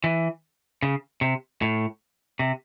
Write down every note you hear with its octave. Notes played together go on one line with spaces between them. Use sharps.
E3
C#3
C3
A2
C3